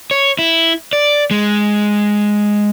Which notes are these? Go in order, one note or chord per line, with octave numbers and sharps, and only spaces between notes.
C#5
E4
D5
G#3